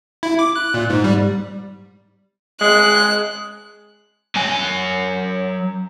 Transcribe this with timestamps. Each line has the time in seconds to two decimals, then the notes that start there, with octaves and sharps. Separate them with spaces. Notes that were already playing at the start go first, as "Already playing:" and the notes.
0.23 E4
0.39 D6
0.56 F#6
0.74 A#2
0.90 G#2
1.04 G3
2.61 G#3 F#6
4.36 F#3 G#5